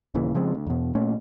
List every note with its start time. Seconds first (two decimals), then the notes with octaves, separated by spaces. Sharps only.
0.14 D#1 A#2 C#3 E3
0.34 C#3 F3 G#3 C4
0.54 D2
0.66 E2 B2
0.95 A#2 A3 C#4